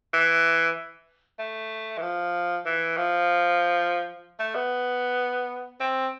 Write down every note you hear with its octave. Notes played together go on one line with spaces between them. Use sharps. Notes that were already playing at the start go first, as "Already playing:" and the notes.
E3
A3
E3
F3
E3
F3
A3
B3
C4